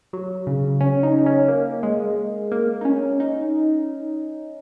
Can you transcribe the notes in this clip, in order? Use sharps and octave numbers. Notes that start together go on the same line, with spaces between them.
F#3
C#3
C#4
D#4
C#4
A#3
G#3
A#3
D#4
C#4
D#4